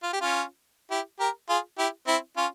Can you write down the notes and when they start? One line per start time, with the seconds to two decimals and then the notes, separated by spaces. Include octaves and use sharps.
0.03 F4
0.13 G4
0.21 C#4 F4
0.91 E4 G4
1.20 G4 A#4
1.49 F4 G#4
1.78 E4 G4
2.07 C4 E4
2.37 C#4 F4